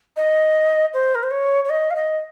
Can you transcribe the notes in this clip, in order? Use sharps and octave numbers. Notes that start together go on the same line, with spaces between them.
D#5
C5
A#4
C5
C#5
C#5
D#5
F5
D#5